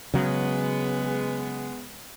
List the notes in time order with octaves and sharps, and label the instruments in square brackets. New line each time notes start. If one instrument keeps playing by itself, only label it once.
[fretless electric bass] C#3 F#3 [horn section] G#3 B3